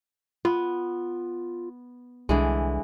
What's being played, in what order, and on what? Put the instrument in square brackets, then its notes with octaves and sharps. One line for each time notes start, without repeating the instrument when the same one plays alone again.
[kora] B3 [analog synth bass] F4
[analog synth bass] C2 [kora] D3 E3 G#3